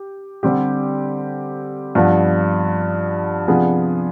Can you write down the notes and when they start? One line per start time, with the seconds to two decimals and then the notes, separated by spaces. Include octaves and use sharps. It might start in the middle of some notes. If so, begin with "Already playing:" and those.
Already playing: G4
0.43 D3 G3 C4 G4
1.95 G2 F3 B3
3.48 C3 F3 B3 D4 G#4